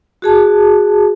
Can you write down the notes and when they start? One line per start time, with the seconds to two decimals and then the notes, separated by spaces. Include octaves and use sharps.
0.22 F#4 G#4 A5